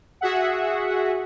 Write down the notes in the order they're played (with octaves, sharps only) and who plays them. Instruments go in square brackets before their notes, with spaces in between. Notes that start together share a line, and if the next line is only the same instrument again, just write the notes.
[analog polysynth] F#4 G#4 E5 F#5